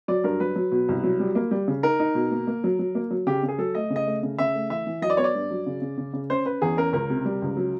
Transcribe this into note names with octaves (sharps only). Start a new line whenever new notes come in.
F#3 D5
G2 A#4
F#3 B4
F#3
B2
C2
F#3
G3
A#3
G3
C#3
D#4 A#4
D#4
B2
A#3
A#3
F#3
F#3
A#3
F#3
C#3 G4
C#3
G#4
F#3 A4
A3 D#5
C#3
D#5
A3
C#3
C#3 E5
A3
E3 E5
E3
F#3 D#5
D5
B3 C#5
D5
G2
F#3
C#3
C#3
C#3
C#3
C#4 C5
C#4 B4
E2 G#4
C#4 A#4
C#2 A#4
C3
G3
C#2
F#3